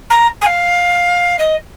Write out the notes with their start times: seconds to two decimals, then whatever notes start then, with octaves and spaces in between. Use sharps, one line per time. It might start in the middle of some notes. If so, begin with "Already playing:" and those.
0.10 A#5
0.41 G#5
0.46 F5
1.38 D#5